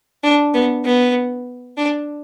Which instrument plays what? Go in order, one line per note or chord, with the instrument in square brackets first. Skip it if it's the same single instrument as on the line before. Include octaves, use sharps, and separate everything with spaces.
[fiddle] D4
B3
B3
D4